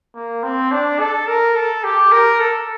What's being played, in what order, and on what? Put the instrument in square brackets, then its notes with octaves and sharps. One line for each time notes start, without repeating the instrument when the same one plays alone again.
[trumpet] A#3
C4
D4
A4
A#4
A4
G4
A#4
A4